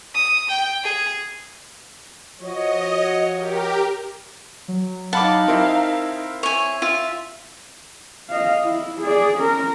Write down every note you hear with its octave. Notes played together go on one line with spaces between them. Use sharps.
D#6
G5
G#4
F3 F#4 C#5 D#5
G4 A#4
F#3
D#4 F5 F#5 A5 B5 D6
C4 E4 A#4
C#5 G#5
F4 E5 E6
D#5 F5
E4
G#4 D5
C#4 A#4